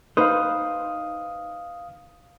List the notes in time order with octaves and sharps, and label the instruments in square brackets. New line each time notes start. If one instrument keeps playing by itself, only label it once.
[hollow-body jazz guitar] D#4 B4 C5 [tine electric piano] F5 D#6